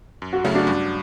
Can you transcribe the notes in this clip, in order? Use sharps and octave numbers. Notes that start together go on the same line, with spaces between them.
F#2
F#4
C#3 F#3 A3 C#4 E4
D4 F#4
G2